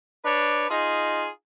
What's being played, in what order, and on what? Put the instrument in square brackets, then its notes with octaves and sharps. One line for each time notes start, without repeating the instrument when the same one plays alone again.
[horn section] D4 B4 C#5
D#4 F4 G#4